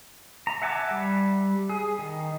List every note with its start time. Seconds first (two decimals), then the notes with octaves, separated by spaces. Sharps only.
0.47 A#5
0.62 E5 F#5 G#5 A5 D6
0.91 G3
1.69 G#4
1.99 D#3